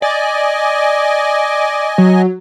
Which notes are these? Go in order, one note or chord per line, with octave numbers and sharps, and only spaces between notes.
D5 D#5 G#5
F#3